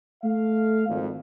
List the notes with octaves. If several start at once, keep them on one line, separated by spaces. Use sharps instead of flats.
A3 F5
G#1 F2